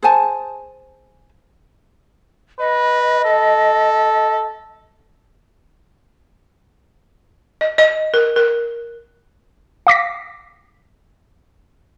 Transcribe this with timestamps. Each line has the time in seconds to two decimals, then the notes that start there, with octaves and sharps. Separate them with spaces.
0.02 G#4 C5 G#5 A5
2.59 B4 D#5
3.25 A4
7.61 D#5
7.78 D#5
8.14 A#4
8.36 A#4
9.87 F5 D6 A#6 B6